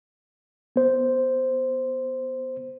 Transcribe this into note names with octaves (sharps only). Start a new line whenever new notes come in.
B3 C5